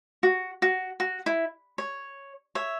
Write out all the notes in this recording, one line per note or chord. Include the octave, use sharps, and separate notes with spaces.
F#4
F#4
F#4
E4
C#5
C#5 E5